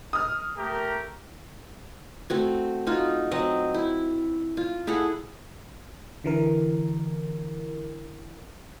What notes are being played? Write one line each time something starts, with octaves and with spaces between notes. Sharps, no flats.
D#6 F6
A3 G4 A#4
A3 C4 F#4
D#4 F4 F#4
F#3 C4 D#5
E4
F4
E4 G#4 A4 F#5
D3 E3 A#4